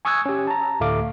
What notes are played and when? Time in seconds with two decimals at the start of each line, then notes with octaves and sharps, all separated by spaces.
0.05 G#5 C#6 D#6 E6 F#6 G#6
0.26 C#4 G4
0.47 A5 A#5
0.80 D2 A2 A3 F5 D6